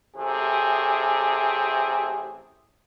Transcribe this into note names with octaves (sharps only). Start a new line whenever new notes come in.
A1 C3 A3 G#4